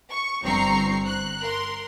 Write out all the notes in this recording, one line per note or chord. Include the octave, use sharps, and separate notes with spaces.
C#6
G1 G2 C4 A#5 C#6 C7
F#6
A#4 C6